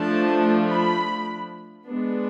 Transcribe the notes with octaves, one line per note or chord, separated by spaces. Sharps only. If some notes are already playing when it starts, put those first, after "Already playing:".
Already playing: F3 A3 D4 A5
B5
G#3 B3 D4